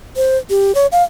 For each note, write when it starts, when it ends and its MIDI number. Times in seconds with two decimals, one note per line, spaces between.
0.16 0.37 72
0.50 0.74 67
0.75 0.86 73
0.92 1.03 77